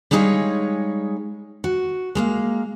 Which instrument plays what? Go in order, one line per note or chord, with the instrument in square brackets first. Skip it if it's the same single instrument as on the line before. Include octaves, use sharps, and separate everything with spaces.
[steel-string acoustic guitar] G3 G#3 D#4 G#4 C#5 F5
F#4
G#3 A#3 F5